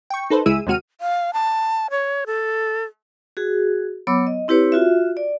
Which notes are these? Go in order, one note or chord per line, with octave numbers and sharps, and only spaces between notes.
G5 C#6
D#4 A4 B4 C5
C#2 G#3 E4 G#4 E6 D#7
D#2 C3 G#3 F#4 F6 D#7
F5
A5
C#5
A4
F#4 G#4
F#3 B3 C#5 B5 D6 E6
D#5
C4 E4 G4 B4 C#5
F4 F#4 E5
D5